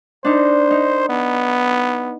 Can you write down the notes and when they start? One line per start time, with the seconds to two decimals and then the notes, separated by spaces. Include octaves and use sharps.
0.25 D4 D#4 C5
0.71 D#4
1.09 B3